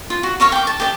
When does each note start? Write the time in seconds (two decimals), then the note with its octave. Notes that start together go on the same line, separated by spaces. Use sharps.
0.10 F4
0.23 F#4
0.40 A#4 C#5 F5 C#6
0.52 G5 D6
0.67 A5
0.80 G4 D5 A5